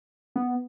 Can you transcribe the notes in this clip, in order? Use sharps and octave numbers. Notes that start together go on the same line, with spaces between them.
B3